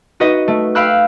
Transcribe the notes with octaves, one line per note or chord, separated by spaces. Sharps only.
D#4 F#4 B4 D#5
A3
F5 G5 B5 E6 F#6